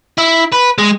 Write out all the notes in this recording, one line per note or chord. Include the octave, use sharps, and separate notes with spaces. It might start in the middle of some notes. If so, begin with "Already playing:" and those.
E4
B4
G#3